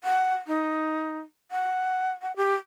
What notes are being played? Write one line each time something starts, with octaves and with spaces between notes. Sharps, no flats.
F#5
D#4
F#5
F#5
G4